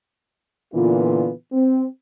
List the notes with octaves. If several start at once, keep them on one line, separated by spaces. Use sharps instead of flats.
A#2 D3 E3 B3 F4
C4